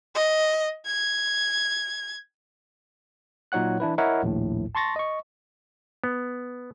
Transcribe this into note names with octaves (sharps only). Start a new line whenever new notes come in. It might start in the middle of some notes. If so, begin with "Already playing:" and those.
D#5
G#6
A#2 F#3 D#4 C#5 F#5 F#6
E3 D4 E4 B4
E4 A#4 C#5 D#5 E5 F#5
A#1 D#2 A2
A5 C6 C#6 A6 A#6
D#5 C#6
B3